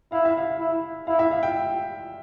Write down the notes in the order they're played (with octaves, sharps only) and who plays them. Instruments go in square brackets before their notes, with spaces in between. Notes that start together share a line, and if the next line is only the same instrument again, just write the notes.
[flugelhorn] E4 [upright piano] F5
[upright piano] E5
F5
[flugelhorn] E4
[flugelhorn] E4 [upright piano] F5
[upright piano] E5
F5
G5